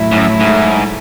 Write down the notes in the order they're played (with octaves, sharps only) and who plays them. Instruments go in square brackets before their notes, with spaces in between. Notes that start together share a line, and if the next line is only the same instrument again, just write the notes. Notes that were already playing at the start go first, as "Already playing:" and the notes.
Already playing: [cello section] A2 F#3 A3 E4
[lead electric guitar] G#2
F#2
G#2